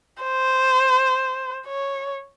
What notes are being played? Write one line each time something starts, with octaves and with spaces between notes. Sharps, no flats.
C5
C#5